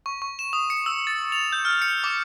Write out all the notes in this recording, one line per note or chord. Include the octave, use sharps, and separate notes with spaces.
C#6
C#6
E7
D#6
C#7
E6
A6
F7
G6
F6
C#7
D6